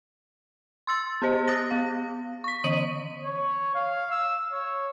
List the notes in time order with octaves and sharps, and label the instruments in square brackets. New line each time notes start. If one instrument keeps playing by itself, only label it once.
[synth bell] C6 E6 A6
B3 G4 C5 D#5
D#6 F#6 A6 A#6
B3 F5
C#6 B6
D3 E3 D#5 D#6 D#7 F#7
[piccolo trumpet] C#5
F5
E6
C#5